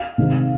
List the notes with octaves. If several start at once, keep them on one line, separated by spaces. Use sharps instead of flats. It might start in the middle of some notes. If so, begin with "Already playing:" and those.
Already playing: F5
C3 D#3 G#3 C4 D#4